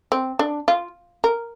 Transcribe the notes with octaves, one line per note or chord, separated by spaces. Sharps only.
C4
D4
F4
A#4